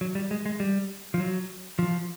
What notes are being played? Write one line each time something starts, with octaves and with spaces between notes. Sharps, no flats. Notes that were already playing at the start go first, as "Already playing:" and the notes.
F#3
G3
G#3
G#3
G3
F3
F#3
F3